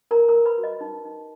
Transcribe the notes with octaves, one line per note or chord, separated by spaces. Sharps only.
A#4 B4 A#5
A#4 A#5
B4
B4 B5
F#4
D#5
D#4
D#4